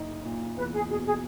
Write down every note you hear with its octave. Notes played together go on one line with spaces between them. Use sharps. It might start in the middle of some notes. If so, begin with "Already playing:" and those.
Already playing: F#1 D#4
A#2
E2 B4
G#4
B2 G#4
G#4